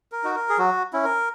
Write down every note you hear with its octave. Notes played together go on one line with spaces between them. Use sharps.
A#4
D#4 F#4
A#4
G#4
F#3 F#4
C#4 E4
A#4